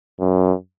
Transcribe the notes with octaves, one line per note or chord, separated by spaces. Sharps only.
F#2